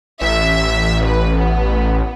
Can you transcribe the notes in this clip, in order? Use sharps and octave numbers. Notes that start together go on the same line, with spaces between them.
A1 E5
B4
B3